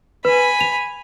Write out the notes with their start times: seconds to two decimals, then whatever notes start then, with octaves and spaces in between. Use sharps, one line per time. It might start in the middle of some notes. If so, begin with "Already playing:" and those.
0.25 B4 G#5 B5
0.61 F7